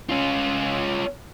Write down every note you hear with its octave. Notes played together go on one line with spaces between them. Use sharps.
C#4 F4